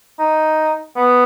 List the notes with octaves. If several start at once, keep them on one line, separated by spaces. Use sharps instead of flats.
D#4
B3